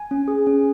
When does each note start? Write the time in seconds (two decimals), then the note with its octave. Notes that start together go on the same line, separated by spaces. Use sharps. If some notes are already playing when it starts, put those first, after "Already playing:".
Already playing: G#5
0.11 C#4
0.28 G#4
0.47 C#4